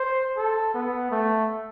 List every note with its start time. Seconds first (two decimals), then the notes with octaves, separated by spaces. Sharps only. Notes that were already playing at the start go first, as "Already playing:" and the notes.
Already playing: C5
0.37 A4
0.74 B3
1.11 A3